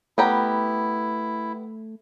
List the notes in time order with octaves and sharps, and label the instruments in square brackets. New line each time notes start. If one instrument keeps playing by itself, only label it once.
[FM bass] A3 [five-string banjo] B3 G4 A#5 [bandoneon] E4